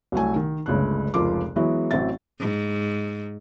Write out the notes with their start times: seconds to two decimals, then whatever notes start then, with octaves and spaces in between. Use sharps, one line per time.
0.12 C2 F#3 A3 G#5
0.36 D#3
0.66 G1 C#2 C#3 A3 F#6
1.14 F1 C#2 F3 F4 A#4 D6
1.56 E3 F#3 G#3 B3 E4
1.91 A1 F#3 C4 E5 A6
2.40 G#2